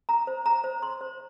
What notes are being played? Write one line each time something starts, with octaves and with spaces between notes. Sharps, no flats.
A#5
C5
A#5
C5
C6
C5